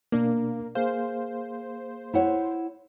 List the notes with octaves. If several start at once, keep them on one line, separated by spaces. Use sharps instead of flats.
B2 A#3 D4 A#4
A#3 G#4 C5 F5
E4 C#5 F#5